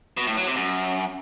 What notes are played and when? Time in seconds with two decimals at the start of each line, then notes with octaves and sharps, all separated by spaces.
0.17 B2
0.27 A2
0.37 F#3
0.46 C3
0.56 F#2